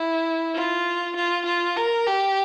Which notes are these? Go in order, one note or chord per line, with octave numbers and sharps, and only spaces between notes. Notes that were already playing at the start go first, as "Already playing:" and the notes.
Already playing: E4
F4
F4
F4
A#4
G4